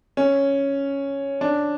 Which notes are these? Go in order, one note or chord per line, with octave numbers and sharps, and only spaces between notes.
C#4
D4